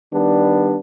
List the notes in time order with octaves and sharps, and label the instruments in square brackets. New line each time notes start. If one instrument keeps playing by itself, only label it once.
[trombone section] D#3 G3 B3 D4